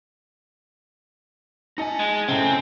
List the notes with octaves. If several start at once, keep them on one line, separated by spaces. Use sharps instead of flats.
D#4 D#5 G#5 A5 C#7
G#3
A2 C#3 C4 F#5 G#5